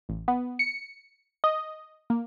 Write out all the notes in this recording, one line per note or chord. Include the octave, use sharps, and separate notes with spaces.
A1
B3
C#7
D#5
A#3